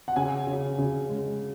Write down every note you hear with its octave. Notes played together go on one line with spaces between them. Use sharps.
F#5
C#3 G#5
C#3
C#3
G#3